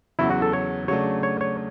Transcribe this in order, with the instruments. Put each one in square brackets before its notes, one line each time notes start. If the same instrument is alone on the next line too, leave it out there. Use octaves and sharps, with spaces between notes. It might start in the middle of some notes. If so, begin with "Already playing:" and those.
[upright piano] E2 C#3 F#3 [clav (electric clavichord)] E4
[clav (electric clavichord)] F#4
A4
C#5
[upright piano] C#3 F#3 A3 D4 [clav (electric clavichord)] C#5
[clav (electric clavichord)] C#5
C#5